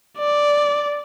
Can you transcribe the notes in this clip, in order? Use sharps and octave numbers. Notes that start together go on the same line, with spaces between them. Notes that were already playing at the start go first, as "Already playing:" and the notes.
D5